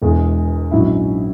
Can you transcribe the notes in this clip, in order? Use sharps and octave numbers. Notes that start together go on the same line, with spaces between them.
E1 E2 B2 G#3
A#1 G#2 F#3 C#4 E4